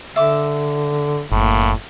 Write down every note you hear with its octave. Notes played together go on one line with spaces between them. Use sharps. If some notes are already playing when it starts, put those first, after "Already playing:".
D3 E5 D6
F#1 A2 A#3